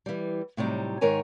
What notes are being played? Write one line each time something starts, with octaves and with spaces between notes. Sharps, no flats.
E3 G3
A2 C3 F#3 G3 D#4
G#2 D#3 A#4 C#5 G#5